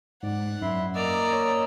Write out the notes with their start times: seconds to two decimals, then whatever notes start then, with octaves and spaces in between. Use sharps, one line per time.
0.23 G#2 D5 F#5
0.61 F#2 E4 E5 C6
0.95 A#3 D5 D#5 A#5 E6
1.33 C#5